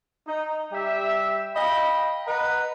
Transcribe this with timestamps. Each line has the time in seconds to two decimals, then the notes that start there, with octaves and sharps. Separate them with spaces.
0.27 D#4
0.72 G3 G4 E5
1.55 D#5 F5 G5 B5
2.25 B4 D#5 F#5 A#5